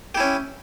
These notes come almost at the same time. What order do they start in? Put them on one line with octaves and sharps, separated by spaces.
G4 E4 C#4